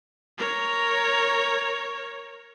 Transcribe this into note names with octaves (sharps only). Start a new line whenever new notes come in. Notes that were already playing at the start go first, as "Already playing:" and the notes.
A#4 C#5